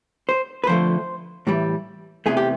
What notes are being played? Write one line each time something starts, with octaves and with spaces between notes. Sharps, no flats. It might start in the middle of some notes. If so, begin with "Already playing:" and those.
C5
B4
F2 D3 F3 A3 C5
A2 E3 G3
E2 C3 E3 A3 G#4
G4